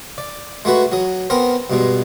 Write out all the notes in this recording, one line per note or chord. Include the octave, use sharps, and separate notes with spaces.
D5
G#3 A3 F#4 B4
F#3 D#6
B3 C4 A#4
G2 B2 G#3